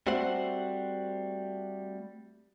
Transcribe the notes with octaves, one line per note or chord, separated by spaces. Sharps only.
G3 A3 C4 F#4 C5 F#5